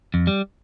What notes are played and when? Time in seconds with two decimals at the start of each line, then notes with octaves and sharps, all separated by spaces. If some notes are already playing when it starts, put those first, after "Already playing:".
0.14 F2
0.27 G3